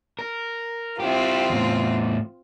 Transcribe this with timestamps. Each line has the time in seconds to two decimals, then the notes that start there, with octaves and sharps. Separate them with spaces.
0.19 A#4
1.00 C4 E4 F4 G4
1.50 E2 A2